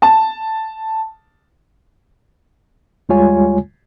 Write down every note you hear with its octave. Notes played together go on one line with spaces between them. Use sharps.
A5
D#2 G3 G#3 F4 C#5 G#5